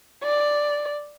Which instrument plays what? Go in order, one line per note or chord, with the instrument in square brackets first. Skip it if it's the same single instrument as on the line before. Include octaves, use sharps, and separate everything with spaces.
[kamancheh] D5